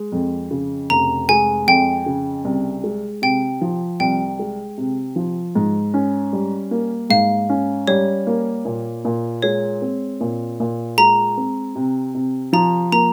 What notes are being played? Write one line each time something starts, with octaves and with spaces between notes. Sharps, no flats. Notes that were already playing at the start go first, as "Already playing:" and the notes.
Already playing: G#3
F2
C#3
F1 A#5
G#3 G#5
F2 G5
C#3
C2
G#3
C3 G5
F3
C2 G5
G#3
C3
F3
G#2
C#4
G3
A#3
G#2 F5
C#4
G3 C#5
A#3
A#2
A#2
G#3 C#5
C4
A#2
A#2
G#3 A#5
C4
C3
C3
F3 A#5
A#3 A#5